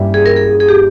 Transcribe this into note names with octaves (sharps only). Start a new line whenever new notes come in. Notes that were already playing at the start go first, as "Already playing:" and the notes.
Already playing: G2 G3 A#3 C#4 E4
G#4
A#4
G#4
G#4
G4